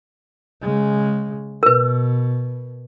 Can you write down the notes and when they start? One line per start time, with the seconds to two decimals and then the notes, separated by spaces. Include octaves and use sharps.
0.62 C#3 G#3
1.63 B2 A#4 B4